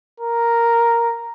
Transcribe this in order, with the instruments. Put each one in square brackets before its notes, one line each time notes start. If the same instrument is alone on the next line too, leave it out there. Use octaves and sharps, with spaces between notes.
[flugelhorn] A#4